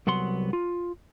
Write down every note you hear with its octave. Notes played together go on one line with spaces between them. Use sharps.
C2 F#3 B3 F#5 C6
F4